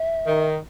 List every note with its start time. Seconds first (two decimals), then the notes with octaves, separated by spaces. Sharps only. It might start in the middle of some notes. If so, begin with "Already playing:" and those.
Already playing: E5
0.26 D#3